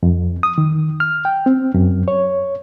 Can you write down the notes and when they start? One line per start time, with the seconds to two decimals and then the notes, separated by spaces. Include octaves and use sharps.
0.03 F2
0.43 D#6
0.58 D#3
1.00 F6
1.25 G5
1.46 C4
1.74 F#2
2.08 C#5